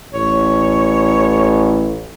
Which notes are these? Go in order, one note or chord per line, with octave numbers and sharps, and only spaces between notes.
A1 C#5